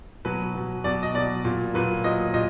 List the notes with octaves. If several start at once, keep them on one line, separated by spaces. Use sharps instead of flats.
B2 F#3 B4
B2 F#3
B2 F#3 D5
D#5
B2 F#3 D5
A#2 F#3
A#2 F#3 B4
A#2 F#3 D#5
A#2 D#5